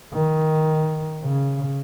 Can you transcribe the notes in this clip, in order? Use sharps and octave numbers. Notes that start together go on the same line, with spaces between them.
D#3
C#3